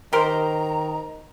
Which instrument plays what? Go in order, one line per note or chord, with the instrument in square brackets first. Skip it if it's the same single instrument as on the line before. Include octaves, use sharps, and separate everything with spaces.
[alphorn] D#3 [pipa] G4 A#4 C5 [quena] A#5